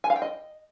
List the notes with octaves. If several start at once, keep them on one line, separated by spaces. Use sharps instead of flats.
G#5
F5
G5
D#5